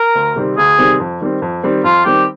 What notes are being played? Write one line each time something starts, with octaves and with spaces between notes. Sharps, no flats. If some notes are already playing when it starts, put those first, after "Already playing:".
Already playing: A#4
D2
C3 D#3 G3 C4
D2 G#4
C3 D#3 G3 C4
F2
D#3 G3 C4
F2
D#3 G3 C4
F2 F4
D#3 G3 C4 G4